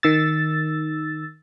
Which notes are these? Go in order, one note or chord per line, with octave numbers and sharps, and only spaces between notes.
D#3 E6 A6